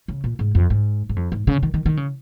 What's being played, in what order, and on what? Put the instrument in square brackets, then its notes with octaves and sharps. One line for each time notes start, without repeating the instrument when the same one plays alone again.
[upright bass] C#3
A#2
G#2
F2
G#2
G#2
F2
G#2
C#3
D#3
D#3
D#3
C#3